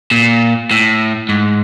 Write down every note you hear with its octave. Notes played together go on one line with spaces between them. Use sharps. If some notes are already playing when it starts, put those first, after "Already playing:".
A#2
A2
G#2